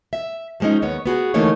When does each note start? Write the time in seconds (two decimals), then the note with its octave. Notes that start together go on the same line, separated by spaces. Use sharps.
0.13 E5
0.60 F3 G3 G#3 C#4 D#4
0.82 D#2 B3 C#5
1.06 B3 F#4 G#4
1.34 D3 E3 A3 A#3 D#4 C#5